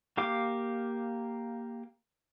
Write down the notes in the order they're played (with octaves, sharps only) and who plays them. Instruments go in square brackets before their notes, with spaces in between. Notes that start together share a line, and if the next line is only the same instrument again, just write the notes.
[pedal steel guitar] A#3 G4 F5 D6